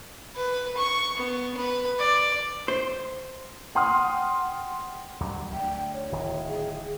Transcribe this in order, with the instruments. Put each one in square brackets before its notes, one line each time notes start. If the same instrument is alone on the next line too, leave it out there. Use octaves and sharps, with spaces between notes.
[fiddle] B4
C#6
B3
B4
D5
[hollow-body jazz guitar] C5
[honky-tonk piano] F#5 G5 C6 D#6 F6
[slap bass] D2 F#3 G3
[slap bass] D2 [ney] G5
[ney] C#5
[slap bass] D1 D#3
[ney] G#4